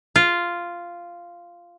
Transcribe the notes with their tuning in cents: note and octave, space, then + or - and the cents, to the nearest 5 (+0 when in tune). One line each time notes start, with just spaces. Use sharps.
F4 -5